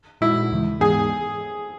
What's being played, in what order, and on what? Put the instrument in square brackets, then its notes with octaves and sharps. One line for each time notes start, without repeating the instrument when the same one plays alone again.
[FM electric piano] A#2 G#3 D#4 F#4 [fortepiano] E4
[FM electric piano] D#2 C#3 E3 G#3
[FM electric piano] G#2 E3 G#3 B3 D#4 [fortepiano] G#4